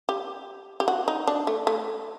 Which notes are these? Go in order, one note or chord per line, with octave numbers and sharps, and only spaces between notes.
G4
G4
F#4
D#4
D4
A3
A3